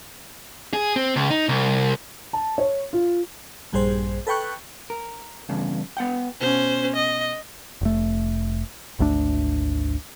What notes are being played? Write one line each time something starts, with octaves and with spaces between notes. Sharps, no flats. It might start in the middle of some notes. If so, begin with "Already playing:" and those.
G#4
C4
C#2
D#4
C2
A5
C#5
F4
A#1 G2 G3 G#4 C5
A4 B4 G5 C#6 F#6
A#4
E2 G2 C#3
B3 F#5 G5
B2 C#4 C5
D#5
F1 A3
G#1 D2 A3 D4